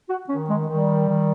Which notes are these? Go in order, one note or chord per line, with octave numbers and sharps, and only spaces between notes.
F#4
D#3 C#4
G#3
D#3 G3
D#3